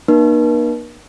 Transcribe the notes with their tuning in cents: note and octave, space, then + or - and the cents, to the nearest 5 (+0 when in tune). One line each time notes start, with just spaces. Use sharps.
A#3 +40 D#4 -40 A#4 +45